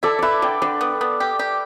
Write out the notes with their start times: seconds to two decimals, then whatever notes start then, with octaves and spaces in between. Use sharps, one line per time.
0.03 E4 A4 D5
0.19 E4 B4 D5 E5
0.42 D3 D5 G5
0.62 D3 D5 G5
0.81 B3
1.01 B3
1.20 G4
1.39 G4